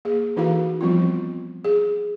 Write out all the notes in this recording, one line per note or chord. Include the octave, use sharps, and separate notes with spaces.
A#3 G#4
E3 D#4 E4 F#4 A4 F5
F3 G3 B3 C4 F4
G#4